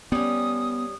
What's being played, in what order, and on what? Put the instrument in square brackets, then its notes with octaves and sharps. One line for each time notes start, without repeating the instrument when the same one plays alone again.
[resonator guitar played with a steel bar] G3 C#4 [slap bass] B3 [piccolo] D#6